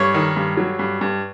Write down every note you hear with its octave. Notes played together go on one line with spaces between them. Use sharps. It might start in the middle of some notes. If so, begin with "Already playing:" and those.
Already playing: G2 C#5
D#3
G2
F#3
G2
G2